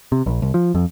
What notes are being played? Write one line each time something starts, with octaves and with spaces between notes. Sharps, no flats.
C3
A#1
C2
F3
F2